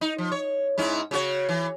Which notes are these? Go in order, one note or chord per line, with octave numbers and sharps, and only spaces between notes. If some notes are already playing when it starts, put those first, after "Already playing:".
D#4
F3
C#5
G#2 C#4 E4
C#3 F#4 C#5
E3